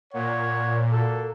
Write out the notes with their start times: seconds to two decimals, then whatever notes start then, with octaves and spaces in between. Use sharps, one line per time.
0.14 A#2 C#5 F#5
0.91 A#3 F#4 A4